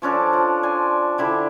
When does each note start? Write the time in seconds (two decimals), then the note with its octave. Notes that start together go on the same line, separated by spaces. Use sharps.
0.02 F3 C#4 D4 A4
0.33 F3
0.63 D5 G#5 C6
1.18 D3 E4 G4